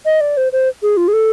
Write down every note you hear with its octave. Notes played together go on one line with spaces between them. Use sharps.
D#5
D5
C5
C5
G#4
F4
G#4
A4